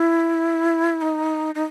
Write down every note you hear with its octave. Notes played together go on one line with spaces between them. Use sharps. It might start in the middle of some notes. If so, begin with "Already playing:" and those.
Already playing: E4
D#4
D#4